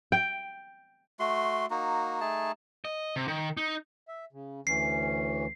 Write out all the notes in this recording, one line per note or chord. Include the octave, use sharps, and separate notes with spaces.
G5
A3 F#4 C6
A#3 D#4 F#4
A3 D#4 G#4 A5
D#5
C3
D#3
D#4
E5
C#3
D2 E3 C#4 C7